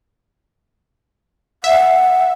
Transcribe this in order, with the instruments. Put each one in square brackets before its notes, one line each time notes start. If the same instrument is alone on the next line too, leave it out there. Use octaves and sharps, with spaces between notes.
[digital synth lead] E5 [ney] F#5